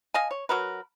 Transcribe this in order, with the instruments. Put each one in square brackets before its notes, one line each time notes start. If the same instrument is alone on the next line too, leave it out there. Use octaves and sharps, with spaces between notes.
[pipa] D#5 F5 G#5
C#5
F#3 F#4 A#4 B4